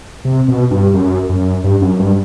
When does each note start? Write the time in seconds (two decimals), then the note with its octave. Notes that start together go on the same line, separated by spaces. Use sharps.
0.25 C3
0.48 B2
0.71 G2
0.94 F#2
1.29 F#2
1.64 G2
1.82 F#2
1.99 G2